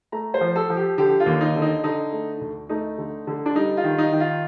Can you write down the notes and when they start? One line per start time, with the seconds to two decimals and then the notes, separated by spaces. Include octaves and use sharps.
0.12 A3 A#5
0.34 C5
0.41 F3
0.56 A4
0.70 F3
0.77 G4
0.98 D3 G4
1.20 F4
1.26 D#2
1.41 D#4
1.56 D3
1.62 D#4
1.84 D3 D#4
2.13 A3
2.41 D2
2.69 A3 D#4
2.98 D3
3.27 D3
3.46 D4
3.55 G3 D#4
3.77 F4
3.84 D#3
3.98 D#4
4.12 D#3
4.20 F4